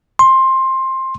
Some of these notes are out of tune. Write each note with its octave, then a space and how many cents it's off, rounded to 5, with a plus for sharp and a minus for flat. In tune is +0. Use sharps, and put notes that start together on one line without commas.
C6 +15